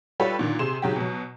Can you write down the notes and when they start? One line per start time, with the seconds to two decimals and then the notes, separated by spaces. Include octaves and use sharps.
0.20 G3 F4 G4 A4 B4 C#5
0.39 A#2 D3 D#3
0.59 C3 G#4 C6 E7
0.82 G#2 C#3 F#3 G4
0.96 B2 F#3